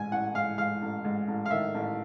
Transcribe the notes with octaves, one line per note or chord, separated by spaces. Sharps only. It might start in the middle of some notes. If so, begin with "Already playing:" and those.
Already playing: A1 G#2 G#5
A1 F#5
G#2 F5
G#2 F5
A1
G#2
A1
F5
D#3 E5
A1